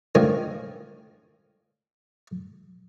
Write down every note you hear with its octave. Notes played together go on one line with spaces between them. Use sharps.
A2 D3 D#3 F3 D#5 G#5